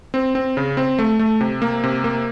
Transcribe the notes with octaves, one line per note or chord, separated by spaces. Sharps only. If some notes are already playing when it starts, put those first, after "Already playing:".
C4
C4
C#3
C4
A3
A3
C3
A#3
C3
A#3